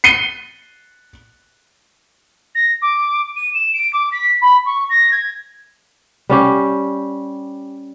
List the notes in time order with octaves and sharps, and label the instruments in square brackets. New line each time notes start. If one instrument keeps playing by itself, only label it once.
[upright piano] C7 C#7 D#7 G7
[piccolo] A#6
D6
D#7
E7
D7
D6
B6
B5
C#6
A#6
G#6
[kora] G3 C#4 G4